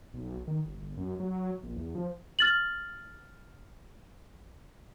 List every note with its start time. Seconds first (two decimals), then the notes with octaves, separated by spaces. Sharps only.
0.14 B1
0.47 D#3
0.65 G1
0.77 G1
0.97 F#2
1.20 F#3
1.63 A#1
1.76 E2
1.95 F3
2.39 F6 A6 F#7